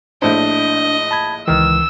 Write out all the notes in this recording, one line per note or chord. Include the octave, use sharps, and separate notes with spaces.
A#1 A2 D4 C5 D#5
A5 B5 G#6
C#2 D#3 E3 E6 F6